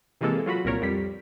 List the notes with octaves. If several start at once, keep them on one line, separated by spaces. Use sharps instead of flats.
C3 E3 G#3 A#3 A4
F#3 F4 F#4 B5
C2 A#2 A#4 C#5
F2 G3 B6